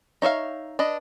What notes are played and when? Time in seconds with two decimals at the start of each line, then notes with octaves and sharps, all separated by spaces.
0.22 D#4 C#5 E5 F5
0.79 D4 B4 D#5